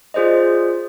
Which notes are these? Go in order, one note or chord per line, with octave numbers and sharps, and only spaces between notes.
F4 G#4 C5 D5 D#5